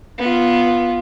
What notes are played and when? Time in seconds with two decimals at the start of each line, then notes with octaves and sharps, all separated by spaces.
0.19 B3 F4